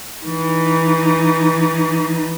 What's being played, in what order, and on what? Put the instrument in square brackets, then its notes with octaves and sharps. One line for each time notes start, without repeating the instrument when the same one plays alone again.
[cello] E3 D#4